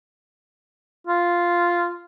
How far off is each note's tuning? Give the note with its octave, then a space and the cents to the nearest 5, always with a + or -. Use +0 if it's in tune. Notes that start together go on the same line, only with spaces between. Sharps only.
F4 -5